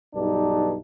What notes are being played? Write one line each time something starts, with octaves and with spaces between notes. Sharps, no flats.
B1 G2 D4 D#4